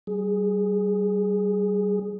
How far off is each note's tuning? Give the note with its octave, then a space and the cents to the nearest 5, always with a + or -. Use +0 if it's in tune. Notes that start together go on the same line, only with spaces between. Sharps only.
G3 -35 G#4 +0